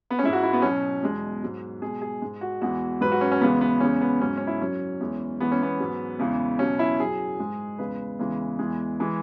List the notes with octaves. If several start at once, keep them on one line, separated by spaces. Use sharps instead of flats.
B3
C#4
G#2 G#3 E4
F#4
E4
B3
B2 F#3 C#4
E2 B2 G#3
G#2 F#3
B2 G#3 G#4
G#4
G#2 G#3
F#4
E2 E3 G#3 F#4
G#2 F#3 B4
F#4
C#4
C#4
E2 C#3 E3 G#3 B3
B3
E2 C#3 G#3 C#4
B3
G#2 F#3 C#4
C#4
E4
F#2 F#3 C#4
E2 E3 G#3
E2 E3 G#3 B3
C#4
B3
G#2 F#3
E2 C#3 E3 G#3
B2 F#3 C#4
E4
F#2 F#3 G#4
G#2 G#3
E2 C#3 G#3 B4
E2 C#3 E3 G#3
E2 E3 G#3
E3 G#3